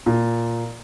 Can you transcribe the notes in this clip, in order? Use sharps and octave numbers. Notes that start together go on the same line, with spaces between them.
A#2